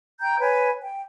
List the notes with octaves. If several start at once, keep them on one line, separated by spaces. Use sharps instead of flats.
G5 A#5 G6
B4 C#5 G#5
G5